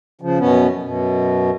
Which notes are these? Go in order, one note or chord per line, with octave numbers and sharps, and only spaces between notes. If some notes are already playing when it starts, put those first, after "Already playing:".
C#3 F3
F#2 B2 B3 C#4
F#2 B2